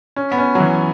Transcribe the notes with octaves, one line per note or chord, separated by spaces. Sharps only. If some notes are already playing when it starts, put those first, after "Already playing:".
C#4
B3
C#4
F#3
E3